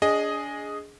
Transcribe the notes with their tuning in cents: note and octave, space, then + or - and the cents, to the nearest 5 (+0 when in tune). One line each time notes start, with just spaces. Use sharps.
D4 -30 G#4 +0 D#5 +0